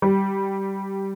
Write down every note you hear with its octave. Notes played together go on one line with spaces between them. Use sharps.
G3